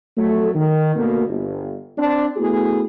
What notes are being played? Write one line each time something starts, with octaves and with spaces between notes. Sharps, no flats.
F2 F#3 A3
D#3
D2 B2 A#3
G1
C4 D4
A3 B3 E4 F#4 G#4